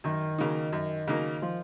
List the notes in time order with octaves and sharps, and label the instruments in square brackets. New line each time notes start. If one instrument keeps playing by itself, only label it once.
[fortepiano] F#2 [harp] D#3
[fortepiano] C#3 F#3 A#3 D#4
F#2
C#3 F#3 A#3 D#4
[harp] F3